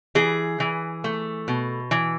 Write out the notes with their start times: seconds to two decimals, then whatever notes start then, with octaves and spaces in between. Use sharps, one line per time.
0.15 E3 G#4
0.60 E3
1.04 A3
1.48 B2
1.91 E3